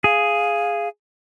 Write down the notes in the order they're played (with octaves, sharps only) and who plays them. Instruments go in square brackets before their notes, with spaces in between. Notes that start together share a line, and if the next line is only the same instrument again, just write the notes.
[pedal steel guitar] G#4 [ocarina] F5